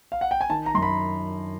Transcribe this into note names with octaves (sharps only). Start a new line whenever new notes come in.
F5
F#5
G5
G#5
D#3 A5
A#5
F#2 C6
B5